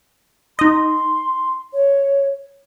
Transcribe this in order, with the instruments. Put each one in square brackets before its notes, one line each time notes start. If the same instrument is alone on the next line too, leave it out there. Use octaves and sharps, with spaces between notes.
[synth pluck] D#4 D#5 [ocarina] C6
[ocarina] C#5